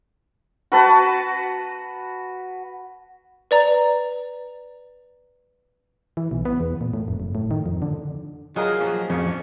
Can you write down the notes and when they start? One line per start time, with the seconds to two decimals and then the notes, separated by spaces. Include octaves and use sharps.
0.72 F#4 B4 A5
3.51 B4 D5 A#5
6.17 E3
6.31 B1
6.45 B3
6.60 E2
6.81 A#2
6.94 A2
7.08 F1
7.20 F#1
7.35 A2
7.51 D#3
7.66 F2
7.82 D3
8.56 F#3 F4 G#4 A#4 D#5 F5 D#6
8.80 A#1 F3 F#4 G#4
9.10 A1 F2 C#3 C#6